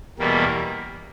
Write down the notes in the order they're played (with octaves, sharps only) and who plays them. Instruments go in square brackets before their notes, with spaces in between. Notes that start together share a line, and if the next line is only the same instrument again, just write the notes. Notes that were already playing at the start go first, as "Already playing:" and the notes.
[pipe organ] E2 B2 G3 A#3